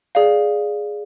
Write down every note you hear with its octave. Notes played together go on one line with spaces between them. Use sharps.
G#4 D5 F5